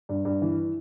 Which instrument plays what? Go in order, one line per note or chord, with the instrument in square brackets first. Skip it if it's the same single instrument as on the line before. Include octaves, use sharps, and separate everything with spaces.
[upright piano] G2
G2
E3